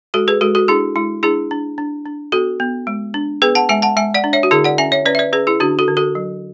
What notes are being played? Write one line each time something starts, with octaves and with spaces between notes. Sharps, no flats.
G#3 F#4 A4
G#4 B4
G#3 F#4 A4
F#4 A4
D4 E4 G#4
G#3 E4
D4 E4 G#4
D4
D4
D4
B3 F#4 A4
B3
G#3
D4
B3 G#4 B4
F#5 A5
G#3 E5 G#5
F#5 A5
G#3 E5 G#5
D5 F#5
D4
C#5 E5
F#4
D3 E4 G#4
D5 F#5
C#4 E5 G#5
C#5 E5
C#4 B4 D5
E5
B4 D5
C#4 G#4 B4
E4 G#4
D3 D4 F#4
F#4 A4
D3
F#4 A4
F#3